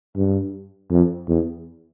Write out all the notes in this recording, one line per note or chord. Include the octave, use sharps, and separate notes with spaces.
G2
F2
E2